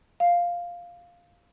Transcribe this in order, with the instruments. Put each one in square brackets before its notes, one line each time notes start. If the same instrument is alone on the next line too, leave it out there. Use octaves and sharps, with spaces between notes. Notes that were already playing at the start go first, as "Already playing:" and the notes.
[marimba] F5